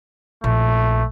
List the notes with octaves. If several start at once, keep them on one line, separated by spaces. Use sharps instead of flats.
A#1 A3